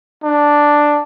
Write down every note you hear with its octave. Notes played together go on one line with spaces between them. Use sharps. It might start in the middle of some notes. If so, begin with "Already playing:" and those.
D4